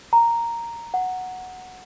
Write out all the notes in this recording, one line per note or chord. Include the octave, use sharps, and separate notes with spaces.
A#5
F#5